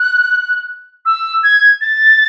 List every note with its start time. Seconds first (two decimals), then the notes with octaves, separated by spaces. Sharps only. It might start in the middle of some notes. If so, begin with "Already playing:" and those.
Already playing: F#6
1.06 E6
1.43 G#6
1.81 A6